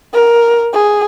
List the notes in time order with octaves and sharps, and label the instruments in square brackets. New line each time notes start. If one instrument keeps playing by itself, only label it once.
[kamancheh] A#4
G#4